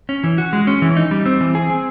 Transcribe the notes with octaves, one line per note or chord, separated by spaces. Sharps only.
C#4
E3
F#4
G#3
C#4
E3
D#4
G3
C4
E3
G#4
C4